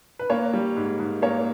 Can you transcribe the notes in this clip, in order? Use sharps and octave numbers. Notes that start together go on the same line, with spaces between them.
B4
A#3 C#5
G3
G#2
G#2
A#3 C#5